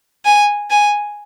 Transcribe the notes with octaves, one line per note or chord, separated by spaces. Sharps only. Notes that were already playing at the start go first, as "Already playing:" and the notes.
G#5
G#5